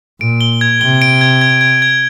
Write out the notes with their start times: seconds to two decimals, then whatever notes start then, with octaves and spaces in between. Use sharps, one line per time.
0.21 A#2 D7
0.41 G7
0.61 G#6
0.81 C3 G7
1.02 D7
1.21 G#6
1.41 G#6
1.61 G#6
1.82 G#6